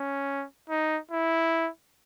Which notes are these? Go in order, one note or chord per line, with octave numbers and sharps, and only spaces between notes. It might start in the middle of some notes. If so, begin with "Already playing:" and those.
Already playing: C#4
D#4
E4